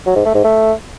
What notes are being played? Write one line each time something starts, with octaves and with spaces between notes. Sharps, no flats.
F#3
G#2
A3
G#2
A3